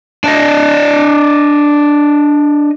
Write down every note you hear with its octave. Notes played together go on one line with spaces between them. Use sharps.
D4 D5 D#5